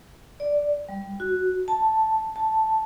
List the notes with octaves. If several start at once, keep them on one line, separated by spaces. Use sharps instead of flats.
D5
G3
F#4
A5
A5